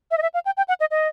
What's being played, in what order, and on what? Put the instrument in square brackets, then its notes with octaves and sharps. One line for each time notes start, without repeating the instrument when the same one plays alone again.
[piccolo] E5
D#5
E5
F5
G5
G5
F#5
D#5
D#5